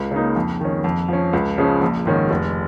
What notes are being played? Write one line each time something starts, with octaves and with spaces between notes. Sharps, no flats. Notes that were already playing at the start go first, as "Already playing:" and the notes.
Already playing: C#2
C#3 A#3 D#4
F2
D#3 C#4
F2
F3 C#4
C#2
C#3 F3 G#3 C#4
A#1
G#2 D#3 C#4
F1